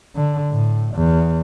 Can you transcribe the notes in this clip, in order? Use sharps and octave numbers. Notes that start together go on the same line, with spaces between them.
D3
A2
E2